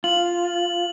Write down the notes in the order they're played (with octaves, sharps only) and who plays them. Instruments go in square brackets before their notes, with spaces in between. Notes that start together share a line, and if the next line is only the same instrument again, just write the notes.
[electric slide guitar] F4 [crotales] F#7